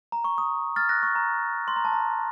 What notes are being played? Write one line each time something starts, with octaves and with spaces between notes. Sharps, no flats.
A#5
C#6
D#6
F6 A6
F#6 A#6
C#6
A#5
C6
A#5
A5
A#5